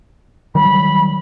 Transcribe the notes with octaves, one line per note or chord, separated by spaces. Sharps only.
D#3 F#3 G3 B5